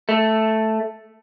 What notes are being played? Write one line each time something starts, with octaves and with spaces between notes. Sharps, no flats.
A3